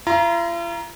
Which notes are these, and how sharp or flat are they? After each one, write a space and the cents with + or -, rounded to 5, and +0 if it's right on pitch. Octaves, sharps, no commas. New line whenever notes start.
F4 -45 A#5 +20